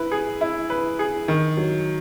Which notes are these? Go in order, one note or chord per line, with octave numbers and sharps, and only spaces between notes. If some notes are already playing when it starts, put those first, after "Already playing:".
Already playing: E4 B4
G#4
E4
B4
G#4
D#3
F#3